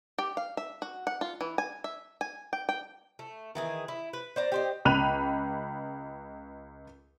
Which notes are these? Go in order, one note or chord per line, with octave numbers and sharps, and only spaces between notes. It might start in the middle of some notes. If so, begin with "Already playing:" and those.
G4
F5
E5
F#4
F#5
F4
E3
G#5
E5
G#5
G5
G5
A3
D#3 E3 G#4
E4
B4
C5 D5 A#5
G4 C5 D#5
C#2 B5 F#6 D#7 F7